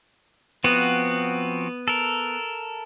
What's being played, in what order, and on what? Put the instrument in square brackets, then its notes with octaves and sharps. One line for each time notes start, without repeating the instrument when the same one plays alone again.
[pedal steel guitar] F3 C4 F#4 [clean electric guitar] B3
[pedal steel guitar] A4 A#4